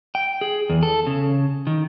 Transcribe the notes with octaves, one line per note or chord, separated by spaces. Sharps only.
G5
G#4
E2
A4
C#3
D#3